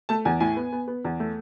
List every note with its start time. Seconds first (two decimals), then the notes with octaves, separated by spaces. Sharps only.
0.09 A3 A5
0.25 E2 G#5
0.40 A2 G#5
0.57 B3
0.72 B3
0.88 B3
1.05 E2
1.20 A3